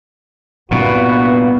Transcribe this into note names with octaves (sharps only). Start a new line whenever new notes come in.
C2 G2 A#2 B3 F#4